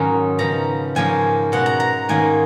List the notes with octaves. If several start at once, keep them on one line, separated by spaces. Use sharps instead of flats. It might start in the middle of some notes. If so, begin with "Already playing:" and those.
Already playing: G#2 D#3 F#3 A#3 C#4 A#5
C#3 F3 B3 A#5
G#2 F3 A#3 C#4 G#5
B2 G#3 B3 F#5
A#5
A#5
G#2 D#3 A#3 C#4 G#5